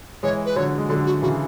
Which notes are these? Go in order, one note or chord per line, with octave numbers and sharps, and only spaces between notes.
E3 G#3 C#5
B4
D3 F#3 C#5
G#3
D3 F#3 A4
F#4
C#3 E3 F#4